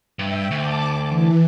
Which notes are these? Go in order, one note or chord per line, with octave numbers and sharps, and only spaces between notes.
G2 E5 G5
D2 A5 D6
E3